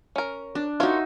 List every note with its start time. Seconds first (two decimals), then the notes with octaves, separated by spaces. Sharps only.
0.16 C#4 A#4
0.55 D4
0.80 D#4 F4 F#4 A#4 C#5 E5